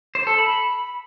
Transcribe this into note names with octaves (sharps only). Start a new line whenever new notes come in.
C5
A4
B5